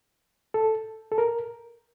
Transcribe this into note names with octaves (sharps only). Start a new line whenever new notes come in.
A4
A4
A#4